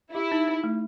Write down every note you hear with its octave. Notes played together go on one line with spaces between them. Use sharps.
E4 G4
D#4
D#4
A3